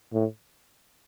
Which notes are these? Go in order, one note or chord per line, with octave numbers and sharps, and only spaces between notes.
A2